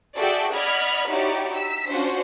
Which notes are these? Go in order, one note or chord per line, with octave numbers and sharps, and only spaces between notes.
F#4 G#4 A4 D5 E5 G5
D5 D#5 F#5 B5 F6 G#6
D#4 E4 F#4 G4 C#5 D5
D#4 E6 B6
C#4 D4 F4 F#4 C5